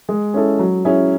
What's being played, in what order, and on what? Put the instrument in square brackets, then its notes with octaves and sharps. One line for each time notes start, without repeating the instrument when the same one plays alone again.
[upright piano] G#3
C#4 E4 A4
F#3
C#4 E4 G#4